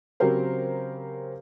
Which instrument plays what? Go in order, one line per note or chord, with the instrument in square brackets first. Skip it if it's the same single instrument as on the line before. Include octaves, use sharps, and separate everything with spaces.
[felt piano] C#3 F#3 C4 G4 A#4 C5